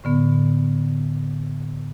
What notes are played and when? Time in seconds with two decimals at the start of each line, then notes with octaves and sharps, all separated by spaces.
0.04 A2 D3 B3